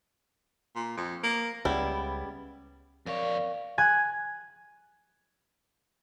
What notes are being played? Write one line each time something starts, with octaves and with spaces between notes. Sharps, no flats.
A#2
F2
A#3
C#2 C#3 G3 B3 E4
F2 A#4 C#5 D5 F5
G#5 F#6 G#6